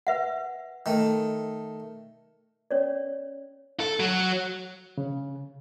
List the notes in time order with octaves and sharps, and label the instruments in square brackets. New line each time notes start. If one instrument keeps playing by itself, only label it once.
[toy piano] B4 E5 F#5
[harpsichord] D#3 A3
[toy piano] C#4 C#5 D5
[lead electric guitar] A4
F#3
[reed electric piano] C#3